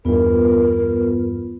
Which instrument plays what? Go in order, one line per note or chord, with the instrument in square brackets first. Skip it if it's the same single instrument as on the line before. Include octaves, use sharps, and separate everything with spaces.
[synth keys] E2 G2 [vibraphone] B3 F4 B4 [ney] A#4